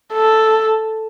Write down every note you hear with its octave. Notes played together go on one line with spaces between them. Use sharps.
A4